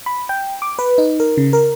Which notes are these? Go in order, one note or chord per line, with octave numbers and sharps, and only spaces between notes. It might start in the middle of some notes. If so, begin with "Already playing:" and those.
B5
G5
D6
B4
D#4
A#4
C#3
A#4